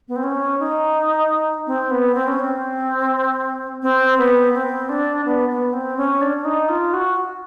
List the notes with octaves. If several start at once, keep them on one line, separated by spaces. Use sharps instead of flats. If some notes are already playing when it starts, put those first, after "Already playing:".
B3
C4
C#4
D#4
C4
B3
C4
C#4
C4
C4
B3
C4
D4
B3
B3
C4
C#4
D4
D#4
F4
F#4